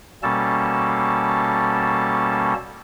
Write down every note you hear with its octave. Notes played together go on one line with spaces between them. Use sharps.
B2 G3 A#3 C#4 A4 A5